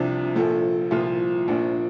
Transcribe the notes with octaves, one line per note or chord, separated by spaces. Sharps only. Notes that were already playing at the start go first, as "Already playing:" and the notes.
Already playing: C2 C3 F3 D4
A#1 A#2 F3 A4
C2 A#2 F3 F4
A#1 A#2 F3 D4